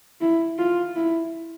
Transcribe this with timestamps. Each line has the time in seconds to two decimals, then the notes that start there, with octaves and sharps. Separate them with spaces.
0.21 E4
0.58 F4
0.96 E4